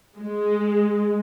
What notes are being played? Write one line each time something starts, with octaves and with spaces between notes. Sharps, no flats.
G#3